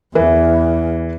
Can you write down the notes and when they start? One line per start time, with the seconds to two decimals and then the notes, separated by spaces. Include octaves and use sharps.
0.15 E2 E3